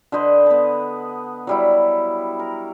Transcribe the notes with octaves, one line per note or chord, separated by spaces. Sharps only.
D3 B4 C5 D#5
B3 A5
F#3 G3 E4
A#4